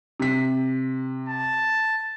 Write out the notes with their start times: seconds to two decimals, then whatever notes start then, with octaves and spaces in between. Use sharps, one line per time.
0.20 C3 B6
1.29 A5